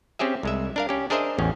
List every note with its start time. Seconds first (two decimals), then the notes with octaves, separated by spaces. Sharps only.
0.19 C4 C#4 G4 G#4 E5
0.43 C2 G#3 E5
0.76 D4 A#4 F5
0.89 C#4 G4
1.10 D4 G#4 A#4 C5 D#5 E5
1.39 A1 E2 C#4